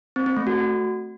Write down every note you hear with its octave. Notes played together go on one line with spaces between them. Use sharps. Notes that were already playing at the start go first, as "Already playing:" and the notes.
C4
C4
A3
F#4